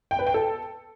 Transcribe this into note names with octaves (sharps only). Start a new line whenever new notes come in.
G5
B4
G5
A4